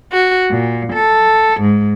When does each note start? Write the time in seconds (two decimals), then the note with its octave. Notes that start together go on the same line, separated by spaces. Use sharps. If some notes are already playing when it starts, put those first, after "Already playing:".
0.11 F#4
0.51 A#2
0.93 A4
1.61 G#2